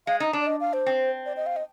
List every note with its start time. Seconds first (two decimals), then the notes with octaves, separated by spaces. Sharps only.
0.07 G#3 F5
0.20 D#4 D#5
0.33 D4
0.41 D5
0.47 D#5
0.60 F5
0.73 C5
0.86 C4
1.26 D5
1.36 D#5
1.46 F5
1.56 D#5